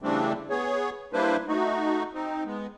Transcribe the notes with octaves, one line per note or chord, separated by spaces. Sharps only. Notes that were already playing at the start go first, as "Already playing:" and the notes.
C#3 E3 G3 A3 C4 D4
B3 G#4 C#5
G3 A#3 D4 E4 B4 C5
A3 D#4 F#4
C4 D#4
G#3 B3